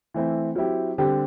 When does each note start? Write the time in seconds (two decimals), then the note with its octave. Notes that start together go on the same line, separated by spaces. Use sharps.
0.14 E3 A3 C4 E4
0.56 F#3 C4 E4 G4
0.98 D3 G3 C4 G4